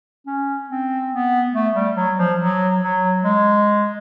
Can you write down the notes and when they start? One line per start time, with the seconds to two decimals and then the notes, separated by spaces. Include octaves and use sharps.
0.27 C#4
0.70 C4
1.12 B3
1.54 A3
1.75 G3
1.96 F#3
2.18 F3
2.39 F#3
2.81 F#3
3.24 G#3